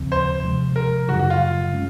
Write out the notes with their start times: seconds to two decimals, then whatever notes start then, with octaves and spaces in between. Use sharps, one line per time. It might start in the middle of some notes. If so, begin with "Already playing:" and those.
Already playing: D#2 C#3 F3 C4
0.12 C5
0.44 C3 F3 G#3
0.76 A#4
1.08 F#2 C#3 F#3 F#4
1.19 F#4
1.30 F4
1.74 G#3 C#4